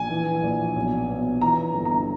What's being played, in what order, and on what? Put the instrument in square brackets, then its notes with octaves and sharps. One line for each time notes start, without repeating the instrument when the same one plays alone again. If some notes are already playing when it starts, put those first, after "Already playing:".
Already playing: [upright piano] A#1 G#5
E3
A#1
B1
B2
E3 A#5
G1
A#5